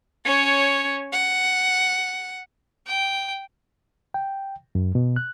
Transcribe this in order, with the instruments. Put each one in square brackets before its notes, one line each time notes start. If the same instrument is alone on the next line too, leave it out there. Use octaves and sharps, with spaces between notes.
[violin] C#4 C#5
F#5
[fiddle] G5
[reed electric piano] G5
F#2
B2
F#6